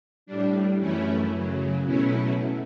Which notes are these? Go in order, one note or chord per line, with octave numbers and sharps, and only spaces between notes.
A2 G3 D4
F#2 E3 A3 C#4 E4
F#2 C#3 F#3
B2 F#3 A3 C#4 E4